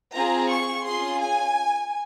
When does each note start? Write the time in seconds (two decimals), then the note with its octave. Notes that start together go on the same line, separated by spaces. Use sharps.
0.15 C4 F4 G#4 A#5
0.50 C#6
0.85 C#4 F4 G#4 C6
1.20 G#5